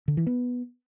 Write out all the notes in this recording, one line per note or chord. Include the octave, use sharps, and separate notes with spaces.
D3
E3
B3